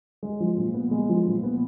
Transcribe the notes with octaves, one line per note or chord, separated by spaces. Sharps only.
G#3
F3
A#2
B3
G#3
F3
A#2
B3